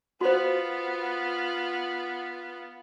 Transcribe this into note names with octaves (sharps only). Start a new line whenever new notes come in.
B3 F4 F#4 C5